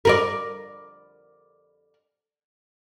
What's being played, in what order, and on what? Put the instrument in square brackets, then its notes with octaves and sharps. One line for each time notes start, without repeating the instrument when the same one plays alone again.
[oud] A#4 B4 D5